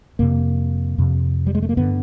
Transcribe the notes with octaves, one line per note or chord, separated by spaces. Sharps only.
F2 C3 A#3
F2 C3
G3
G#3
A3
A#3
G2 D3 B3